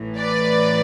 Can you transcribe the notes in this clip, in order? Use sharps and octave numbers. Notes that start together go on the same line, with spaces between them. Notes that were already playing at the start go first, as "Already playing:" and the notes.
Already playing: A1 A2 E3
B4 D5